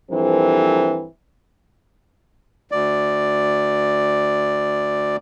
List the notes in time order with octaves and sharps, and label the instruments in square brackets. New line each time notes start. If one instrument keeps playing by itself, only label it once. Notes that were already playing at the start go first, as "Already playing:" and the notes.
[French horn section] G2 E3 F3 C4 A4 A#4
[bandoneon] D2 D5